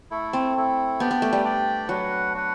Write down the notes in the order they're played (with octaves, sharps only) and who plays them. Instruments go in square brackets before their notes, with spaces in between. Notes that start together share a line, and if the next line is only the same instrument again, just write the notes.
[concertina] A3 E4 A4
[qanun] C4
[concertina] A3 E4 A4
[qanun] B3 [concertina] D4 G4 D5 G5
[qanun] B3
A3
G3
[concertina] D4 G4 D5 G5
[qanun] F#3 [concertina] D4 F#4 B4 F#5
[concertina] D4 F#4 B4 F#5